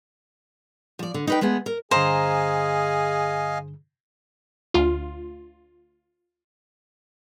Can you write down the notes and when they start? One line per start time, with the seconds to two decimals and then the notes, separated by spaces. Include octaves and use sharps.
0.99 F3 D5
1.14 D3
1.27 D#4 B4 G5
1.41 G#3 A3 B3 G#4
1.66 A#4
1.91 G2 D3 G#4 C5 D#5 F5 G#5 A#5
4.74 D2 F4